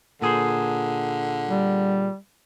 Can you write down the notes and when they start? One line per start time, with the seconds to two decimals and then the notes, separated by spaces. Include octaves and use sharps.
0.22 A#2 D3 G#4 C5
1.49 G3